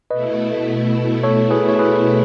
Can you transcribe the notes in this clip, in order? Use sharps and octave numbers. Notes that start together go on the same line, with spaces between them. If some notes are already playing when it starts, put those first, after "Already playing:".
B2 A3 E4 B4 D#5
A4 C#5
G#4 B4
C#5
G#4 B4